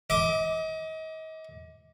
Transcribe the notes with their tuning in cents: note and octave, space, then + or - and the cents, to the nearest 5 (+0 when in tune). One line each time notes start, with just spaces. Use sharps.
D#5 +35 D6 +0